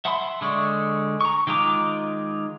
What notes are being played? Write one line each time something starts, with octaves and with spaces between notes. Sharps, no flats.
E5 F#5 A5 B5 C6
D3 G#3 D5 C#6
A#5 C#6
D#3 G#3 F4 A#5 D6